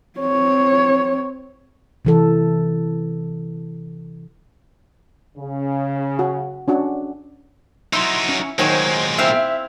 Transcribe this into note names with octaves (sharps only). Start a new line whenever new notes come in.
C4 C#5
C3 E3 A4
C#3
F#4
C#4 D4 F#4
F#3 D#4 E4 C6
C#4
A#2 D#3 F#3 G#3 C5 G#5
C4 E4 E5 F5